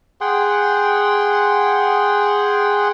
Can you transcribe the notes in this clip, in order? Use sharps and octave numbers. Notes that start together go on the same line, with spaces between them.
G#4 F#5 G5 C6